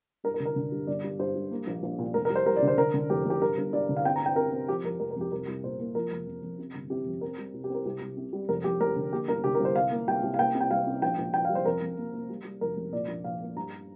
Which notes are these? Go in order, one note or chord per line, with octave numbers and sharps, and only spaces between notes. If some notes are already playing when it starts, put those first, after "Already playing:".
G2 A#4
A#4
D3
A#4
D3
G2
G1 D5
G2
G2 C5
G2
A#3
A#1
A#1
A#2
F1 A#4
A#4
G3
C5
G3 A#4
D5
D3
C5
D3 A#4
D3
F1 G4
F1 G4
G2 A#4
G1
G2 D5
D3
F5
C4 G5
A#5
C4 G5
C3 A#4
C4
F3 G4
F2 A#4
F1 A#4
A#4
F2 G4
C2 A#4
C2
A#2 C5
A#3
F3 A#4
F1
F2
F2
C3
G1
C3 G4
F2
C4 A#4
G3
C2
G4
C4 A#4
C2 G4
C2
C3
G3
F1 A#4
F2 G4
F1 A#4
D3
A#3 G4
G1 A#4
D3 G4
A#4
G1
C5
C2 F5
A#3
C2 G5
C2
F5
A#3 G5
C3
G5
G3 F5
C3
A#1 G5
A#1
A#1 G5
F5
G3
C5
F2 A#4
F2
A#3
A#3
G3
G3
F1 A#4
F1
A#2 D5
A#1
A#1 F5
A#3
G2 A#5